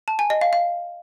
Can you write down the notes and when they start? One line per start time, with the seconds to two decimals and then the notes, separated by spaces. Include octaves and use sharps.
0.08 A5
0.19 G#5
0.30 D#5
0.41 F5
0.53 F5